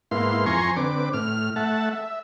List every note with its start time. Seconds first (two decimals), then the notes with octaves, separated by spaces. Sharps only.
0.11 G#2 A#3 B3 E4 F5 C6
0.46 F2 G#5 A#5 C6 C#6
0.76 D3 C4 B4 D6
1.13 A2 F6
1.56 A3 E5 F#5 A5
1.91 E5